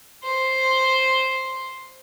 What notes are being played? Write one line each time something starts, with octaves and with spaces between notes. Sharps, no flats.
C5